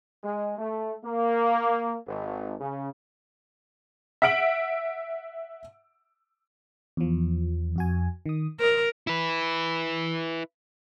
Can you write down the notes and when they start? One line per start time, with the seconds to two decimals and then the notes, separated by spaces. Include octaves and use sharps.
0.23 G#3
0.58 A3
1.04 A#3
2.07 G#1
2.60 C#3
4.22 E5 F#5 E6 D7 F#7
6.97 E2 F3
7.76 F2 F#4 G#5
8.26 D#3 D#6
8.60 A#4 C5 D#5
9.07 E4 B4